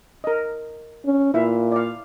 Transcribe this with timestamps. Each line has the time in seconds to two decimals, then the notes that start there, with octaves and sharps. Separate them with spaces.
0.24 A#4 D#5
1.05 C#4
1.34 A#2 E4 E5 F5
1.72 D5 F5